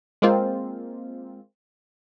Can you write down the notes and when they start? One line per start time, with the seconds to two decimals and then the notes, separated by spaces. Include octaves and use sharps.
0.22 G#3 A#3 C4 F4